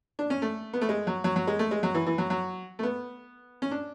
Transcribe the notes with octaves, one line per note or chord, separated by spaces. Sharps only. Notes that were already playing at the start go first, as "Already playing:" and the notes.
D4
C#4
A3
B3
A3
G#3
F#3
F#3
F#3
G#3
A3
G#3
F#3
E3
E3
F#3
F#3
A3
B3
C#4
D4